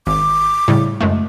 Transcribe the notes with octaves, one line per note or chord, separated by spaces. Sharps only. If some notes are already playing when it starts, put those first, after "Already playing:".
G#1 D6
A2 C#3 G3
F#2 G#3 A3